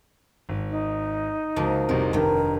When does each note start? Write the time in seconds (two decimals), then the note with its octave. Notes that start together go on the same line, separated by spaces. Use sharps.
0.49 G#1
0.70 D#4
1.56 C#2 F3 A#3 F#4
1.89 F1 C2 C3 A#4
2.13 F1 G2 D#3 A#4